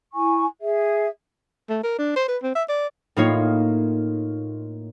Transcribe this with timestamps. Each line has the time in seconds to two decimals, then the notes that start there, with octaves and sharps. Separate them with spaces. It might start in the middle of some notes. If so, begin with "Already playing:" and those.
0.13 E4 G#5 C#6
0.60 G#4 E5
1.69 A3
1.83 A#4
1.98 D4
2.16 C5
2.28 B4
2.43 C4
2.55 E5
2.69 D5
3.16 A2 A#3 D#4 F4 C#5